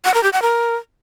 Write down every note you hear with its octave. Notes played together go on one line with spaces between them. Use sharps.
F#5
A#4
G4
F#5
A#4